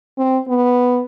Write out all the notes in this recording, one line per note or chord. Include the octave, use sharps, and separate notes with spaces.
C4
B3